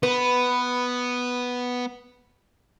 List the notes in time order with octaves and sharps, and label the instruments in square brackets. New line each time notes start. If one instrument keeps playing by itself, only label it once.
[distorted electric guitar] B3 [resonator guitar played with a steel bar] B4